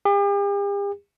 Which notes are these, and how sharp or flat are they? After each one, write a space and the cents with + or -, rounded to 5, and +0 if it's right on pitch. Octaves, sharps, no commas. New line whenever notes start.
G4 +45